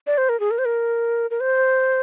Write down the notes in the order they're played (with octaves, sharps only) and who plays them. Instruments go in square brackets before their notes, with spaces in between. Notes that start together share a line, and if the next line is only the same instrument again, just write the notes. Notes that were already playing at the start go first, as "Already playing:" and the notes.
[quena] D5
C5
A#4
G#4
A#4
C5
A#4
A#4
C5